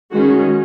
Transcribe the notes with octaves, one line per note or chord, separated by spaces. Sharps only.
D#3 G#3 C#4 F#4